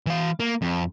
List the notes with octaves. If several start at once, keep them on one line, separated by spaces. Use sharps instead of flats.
E3 F5
A#3
F2